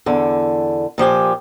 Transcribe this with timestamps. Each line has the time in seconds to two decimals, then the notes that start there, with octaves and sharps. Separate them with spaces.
0.06 E2 D3
0.98 A#2 F3 G4 G#5